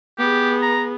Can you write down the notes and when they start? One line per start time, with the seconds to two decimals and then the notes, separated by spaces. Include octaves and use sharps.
0.19 B3 G4 G#4
0.62 A#5